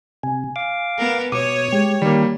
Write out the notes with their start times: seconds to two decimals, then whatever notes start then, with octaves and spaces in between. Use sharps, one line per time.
0.23 C3 G#5
0.56 F5 D6
0.98 B3 A#4
1.32 B2 C#5 D6 D#6
1.72 G#3 G4
2.02 D#3 G3 A#3